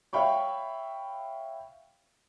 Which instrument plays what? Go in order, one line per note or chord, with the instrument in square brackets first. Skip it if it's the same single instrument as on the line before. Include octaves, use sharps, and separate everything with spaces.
[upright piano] C#5 E5 F5 G5 B5 C#6